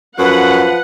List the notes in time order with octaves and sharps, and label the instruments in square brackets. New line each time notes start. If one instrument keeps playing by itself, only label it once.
[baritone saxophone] F#2 [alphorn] F3 [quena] B4 [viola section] F#5